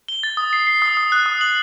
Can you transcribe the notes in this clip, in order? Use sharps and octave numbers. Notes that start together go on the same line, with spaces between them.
G7
A6
D#6
C7
C7
D#6
D#6
F#6
D#6
F#7